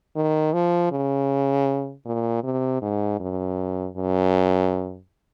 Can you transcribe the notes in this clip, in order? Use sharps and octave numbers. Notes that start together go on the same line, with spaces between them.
D#3
F3
C#3
A#2
C3
G#2
F#2
F#2